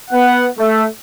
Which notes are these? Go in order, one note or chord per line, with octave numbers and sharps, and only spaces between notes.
B3 F#5
A3